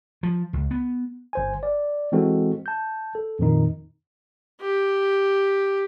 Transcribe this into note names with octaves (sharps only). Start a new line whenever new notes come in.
F3
C#2
B3
G1 C5 G#5
D5
E3 G#3 C4 F#4 A4
A5 G6
A4
F2 A#2 D#3 D#4
G4